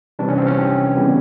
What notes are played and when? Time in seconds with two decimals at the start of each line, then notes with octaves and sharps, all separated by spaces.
0.19 C3 E3 G3 C4 D4
0.29 C#4
0.38 C4
0.47 C#4
0.96 C#3 E3 G3 B3